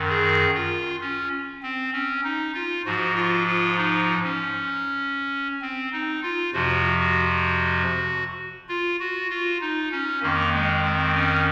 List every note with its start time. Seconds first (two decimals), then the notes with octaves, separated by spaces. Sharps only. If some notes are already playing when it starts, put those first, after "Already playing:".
Already playing: F#2 D#3
0.09 G#4
0.55 F4
1.01 C#4
1.63 C4
1.93 C#4
2.24 D#4
2.54 F4
2.86 G#2 F3 F#4
3.15 F4
3.47 F4
3.77 D#4
4.23 C#4
5.61 C4
5.92 D#4
6.23 F4
6.53 F2 C3 F3 F#4
7.00 F#4
8.69 F4
9.00 F#4
9.30 F4
9.61 D#4
9.92 C#4
10.22 F2 D#3 A#3
10.53 G#3
10.84 C4
11.14 C#4